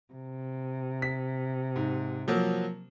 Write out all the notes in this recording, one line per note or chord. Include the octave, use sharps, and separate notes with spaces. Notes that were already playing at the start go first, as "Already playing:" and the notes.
C3
B6
G#2
F3 F#3 A#3